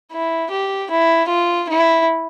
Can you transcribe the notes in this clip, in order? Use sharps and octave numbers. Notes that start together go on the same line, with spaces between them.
E4
G4
E4
F4
E4